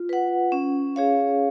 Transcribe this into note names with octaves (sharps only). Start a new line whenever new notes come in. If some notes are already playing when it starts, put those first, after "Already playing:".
Already playing: F4
B4 F#5
C#4
G#4 C#5 F5